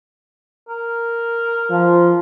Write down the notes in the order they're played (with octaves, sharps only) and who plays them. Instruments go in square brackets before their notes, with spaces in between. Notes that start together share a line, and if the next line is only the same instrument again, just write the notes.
[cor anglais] A#4
[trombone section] F3